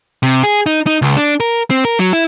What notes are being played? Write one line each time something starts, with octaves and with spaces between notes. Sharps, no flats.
C3
G#4
D#4
D#4
C#2
D4
A#4
C4
A#4
F#3
E4